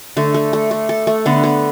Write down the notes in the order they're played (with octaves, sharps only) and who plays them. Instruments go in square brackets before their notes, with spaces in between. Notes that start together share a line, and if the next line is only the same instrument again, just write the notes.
[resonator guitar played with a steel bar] D3 [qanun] A3
[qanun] A3
A3
A3
A4
A3
[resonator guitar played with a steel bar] D3 [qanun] B3
[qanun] B3